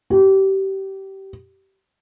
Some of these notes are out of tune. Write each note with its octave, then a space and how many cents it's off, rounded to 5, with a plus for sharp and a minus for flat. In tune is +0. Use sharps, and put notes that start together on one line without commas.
G4 -25